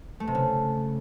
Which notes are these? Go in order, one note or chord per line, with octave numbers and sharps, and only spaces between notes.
A3
C3
C#3